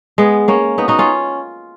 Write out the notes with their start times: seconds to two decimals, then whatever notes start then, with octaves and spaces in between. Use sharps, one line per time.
0.18 G#3 B3
0.48 A#3 C#4
0.78 B3 D#4
0.88 D#4 F#4
0.99 C#4 F4